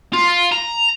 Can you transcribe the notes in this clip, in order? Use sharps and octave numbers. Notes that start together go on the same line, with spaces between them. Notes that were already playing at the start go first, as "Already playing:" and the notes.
F4
A#5